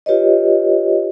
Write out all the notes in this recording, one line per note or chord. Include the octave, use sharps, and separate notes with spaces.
F4 G4 B4 C#5 D#5